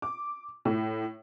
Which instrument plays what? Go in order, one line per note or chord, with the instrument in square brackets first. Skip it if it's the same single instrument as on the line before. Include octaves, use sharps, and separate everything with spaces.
[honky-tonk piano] D6
A2